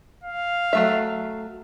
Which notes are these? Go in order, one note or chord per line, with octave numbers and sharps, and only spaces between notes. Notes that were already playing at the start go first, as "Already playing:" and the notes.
F5
F#3 A3 E5